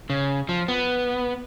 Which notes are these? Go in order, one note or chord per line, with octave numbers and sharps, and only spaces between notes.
C#3
F3
B3